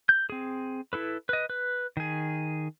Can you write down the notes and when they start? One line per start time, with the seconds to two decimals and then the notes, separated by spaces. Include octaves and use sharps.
0.09 G6
0.30 C4 G#4
0.93 E4 A4 B4
1.29 B4 D#5
1.50 B4
1.97 D#3 G#4